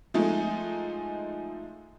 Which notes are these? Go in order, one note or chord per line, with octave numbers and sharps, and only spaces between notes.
F3 G#3 A3 D#4